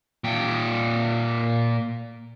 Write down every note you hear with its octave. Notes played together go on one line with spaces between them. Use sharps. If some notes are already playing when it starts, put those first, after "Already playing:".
A#2 G5